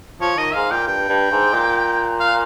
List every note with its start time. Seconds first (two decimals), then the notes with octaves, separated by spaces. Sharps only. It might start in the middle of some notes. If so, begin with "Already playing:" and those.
0.21 F3 C#5
0.37 D#3 D#5
0.54 G#2 F5
0.71 A#2 G5
0.87 G2 G5
1.09 G2
1.31 G#2
1.53 A#2
2.20 F5